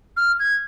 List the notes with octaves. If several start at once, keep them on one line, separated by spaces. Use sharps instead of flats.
F6
G#6